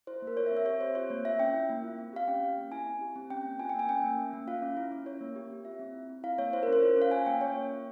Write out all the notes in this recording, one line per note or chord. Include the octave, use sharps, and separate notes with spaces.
E4 C5
A#3
A#4
F4 C#5
E5
C4
E5
G4 C#5
C4 C5
F4 C#5
A#3
F4 E5
C#4 G5
E4
A#3
F4
C4
G4 F5
C#4 G5
C#4
A#3
E4 G#5
C4
G4
C4
C#4 G5
A#3
F4 G#5
G5
A#3
G#5
C#4 G5
A#3
C#4
A#3
F4 F5
C#4
E4
C#4
F4 C#5
A#3
G4
C4
F4 E5
C4
E4
C4
E4 F5
A#3 C#5
E4 C5
A#4
C#4
C5
F4 C#5
C#4 F5
F4 G#5
A#3 G5
C#4 C#5
A#3
F4